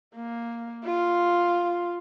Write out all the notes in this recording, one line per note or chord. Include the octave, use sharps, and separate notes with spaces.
A#3
F4